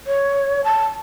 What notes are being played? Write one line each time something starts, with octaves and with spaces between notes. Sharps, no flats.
C#5
A5